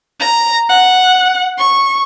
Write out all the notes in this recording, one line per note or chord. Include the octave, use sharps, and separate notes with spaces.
A#5
F#5
C#6